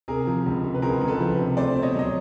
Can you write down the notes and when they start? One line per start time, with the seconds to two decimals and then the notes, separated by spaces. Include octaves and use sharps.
0.08 C3 G#4 A#4
0.27 F3
0.46 C#2
0.64 C3
0.74 B4
0.82 C#2 G#4 A#4
1.01 C#2
1.08 A4 B4
1.20 F3
1.39 C3
1.57 A3 C5 D5
1.76 B2
1.82 C#5 D#5
1.95 F#3 D#5